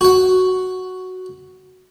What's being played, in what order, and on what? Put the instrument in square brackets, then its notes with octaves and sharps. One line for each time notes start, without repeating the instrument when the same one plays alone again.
[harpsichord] F#4 F#5